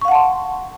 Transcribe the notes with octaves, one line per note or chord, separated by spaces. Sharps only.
F5 F#5 A5 C6 C#6